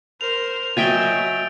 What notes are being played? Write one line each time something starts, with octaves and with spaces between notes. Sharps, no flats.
A#4 C5 F7
F#3 D#5 E5 G5 G#5 A6 D7 G7